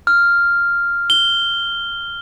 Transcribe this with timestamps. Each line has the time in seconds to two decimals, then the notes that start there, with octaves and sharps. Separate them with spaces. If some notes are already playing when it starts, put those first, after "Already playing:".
0.07 F6
1.10 G7